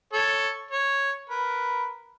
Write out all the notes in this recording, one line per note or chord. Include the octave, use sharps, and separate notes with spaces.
A4 C#5
C#5
A#4 B4